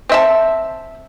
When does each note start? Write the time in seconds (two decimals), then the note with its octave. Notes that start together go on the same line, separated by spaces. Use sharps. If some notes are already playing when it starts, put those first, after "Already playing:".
0.09 C4 E5 A5